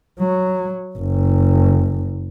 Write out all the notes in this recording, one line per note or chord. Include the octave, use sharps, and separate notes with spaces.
F#3
F#1